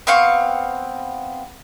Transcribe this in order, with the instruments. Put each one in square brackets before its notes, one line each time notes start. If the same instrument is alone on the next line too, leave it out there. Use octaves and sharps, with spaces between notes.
[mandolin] B3 C4 F5 C#6